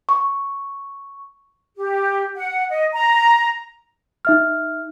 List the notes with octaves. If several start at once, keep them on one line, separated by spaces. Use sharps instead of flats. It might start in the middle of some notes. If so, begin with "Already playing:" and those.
C#6
G4
F#5
D#5
A#5
D#4 E5 F6